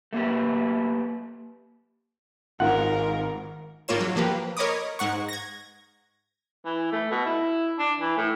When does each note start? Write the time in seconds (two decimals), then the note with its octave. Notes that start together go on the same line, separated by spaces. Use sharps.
0.13 A3 A#3 G4 B4
2.60 G#1 G#2 F4 A#4 F#5
3.88 G#1 A#3 F4 C#5 E7
4.01 F#3
4.16 F3 A#3 G4 B4
4.57 A#4 C#5 D#5 B5 D6 D#6
4.99 G#2 F#5 C#6
5.29 G#6 A#6
6.65 E3
6.92 A3
7.11 B2
7.25 E4
7.79 D4
8.00 E3
8.17 A2